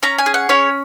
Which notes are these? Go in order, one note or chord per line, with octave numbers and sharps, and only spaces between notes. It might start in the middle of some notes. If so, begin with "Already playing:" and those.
C#4 A#5
G#5
G#4
F#5
C#4 C#5